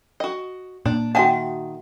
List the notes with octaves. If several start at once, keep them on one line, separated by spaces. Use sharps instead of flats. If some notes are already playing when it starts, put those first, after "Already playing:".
F#4 D#5
A#2 D4
D#3 F#4 E5 F#5 G#5 A5